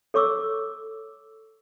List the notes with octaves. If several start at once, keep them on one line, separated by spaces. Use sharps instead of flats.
A4 C#5 C#6 D6 E6